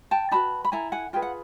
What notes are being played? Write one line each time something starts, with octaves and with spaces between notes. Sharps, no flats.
G5 A5
D#4 F#4 B4 A5 B5
B5
E4 A4 G#5 A#5
F#5 G#5
F4 G#4 B4 G5
F#5